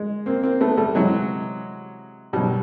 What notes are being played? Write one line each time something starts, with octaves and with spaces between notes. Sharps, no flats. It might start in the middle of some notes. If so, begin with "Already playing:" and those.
Already playing: G#3
A#3 C4
A#3 C4
A3 B3
G3 A3
C3 E3 F#3 G#3
B2 F#3 G3